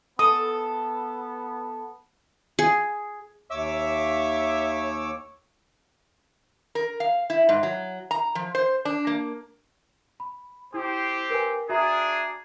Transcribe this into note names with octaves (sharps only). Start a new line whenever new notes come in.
B3 A4 D#6
G#4
D#2 C#5 E5 D6 E6
A#4
F5
E4
G#2
F#3
A#5
F3
C5
D4
A#3
B5
C4 E4 G4 C5
A#4 B4 G#5
D4 F#4 G#4 E5 A#5